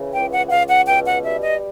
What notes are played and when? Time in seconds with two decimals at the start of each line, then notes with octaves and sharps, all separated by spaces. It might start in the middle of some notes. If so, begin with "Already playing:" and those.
Already playing: C#3 E3
0.16 C#2 G5
0.34 F#5
0.48 F#5
0.52 C#2 F5
0.71 F#5
0.89 B2 G5
1.07 F#5
1.25 G3 E5
1.44 D#5